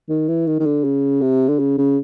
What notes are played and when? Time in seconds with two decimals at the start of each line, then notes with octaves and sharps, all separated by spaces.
0.09 D#3
0.28 E3
0.47 D#3
0.60 D#3
0.66 D3
0.84 C#3
1.22 C3
1.49 D3
1.59 C#3
1.78 C#3